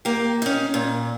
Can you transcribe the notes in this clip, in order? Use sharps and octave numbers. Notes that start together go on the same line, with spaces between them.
A#3 G4
C#4 D#4
A#2